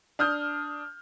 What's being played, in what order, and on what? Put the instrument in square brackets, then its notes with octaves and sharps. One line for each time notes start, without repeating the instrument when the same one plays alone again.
[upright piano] D4 D#6 F6 G6